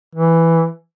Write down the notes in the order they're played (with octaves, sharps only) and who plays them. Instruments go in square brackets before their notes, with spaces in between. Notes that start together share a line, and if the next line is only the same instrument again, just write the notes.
[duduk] E3